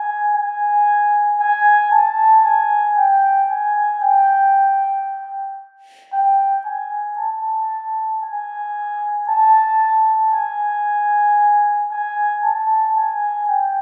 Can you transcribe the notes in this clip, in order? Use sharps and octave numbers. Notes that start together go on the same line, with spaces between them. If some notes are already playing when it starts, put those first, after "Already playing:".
Already playing: G#5
G#5
G#5
A5
G#5
G5
G#5
G5
G5
G#5
A5
G#5
A5
G#5
G#5
A5
G#5
G5